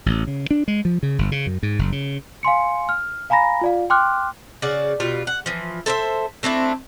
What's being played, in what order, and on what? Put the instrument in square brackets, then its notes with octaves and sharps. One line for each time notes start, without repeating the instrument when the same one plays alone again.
[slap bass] A1
C#3
D4
G#3
F3
C#3
G1
C#3
F#2
G#2
F#1
C#3
[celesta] F5 G#5 C6 C#7
F6
F5 G#5 A#5 B5 A#6
F4 D5 F5
G5 C6 D6 F6 F#6
[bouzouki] C#3 F#4 D5
B2 G3 F4
F#5
E3 F3
A4 C5 D#5 E5
A3 C4 D4 E4